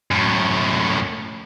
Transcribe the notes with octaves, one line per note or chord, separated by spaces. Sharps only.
F#2 A2